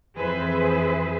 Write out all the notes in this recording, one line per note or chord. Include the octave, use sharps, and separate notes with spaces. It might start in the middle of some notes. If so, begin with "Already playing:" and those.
F2 E3 G#4 B4 C5 E5